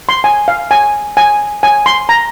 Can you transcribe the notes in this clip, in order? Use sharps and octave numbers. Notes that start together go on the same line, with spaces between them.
C6
G#5
F5
G#5
G#5
G#5
C6
A#5